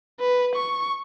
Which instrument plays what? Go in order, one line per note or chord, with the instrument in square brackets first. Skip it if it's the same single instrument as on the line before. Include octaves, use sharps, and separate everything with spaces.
[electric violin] B4
C#6